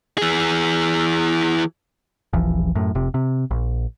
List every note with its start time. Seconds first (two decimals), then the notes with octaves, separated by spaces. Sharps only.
0.18 E3 G#4
2.33 E1 A#1 E3 F3
2.75 F#2 A2
2.95 F1 C3
3.14 C3
3.51 A#1